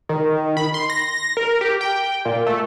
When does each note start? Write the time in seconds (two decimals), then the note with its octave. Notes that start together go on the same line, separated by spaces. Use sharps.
0.09 D#3
0.57 B5
0.74 C6
0.90 A#6
1.37 A#4
1.61 G4
1.81 G5
2.25 A#2
2.47 A3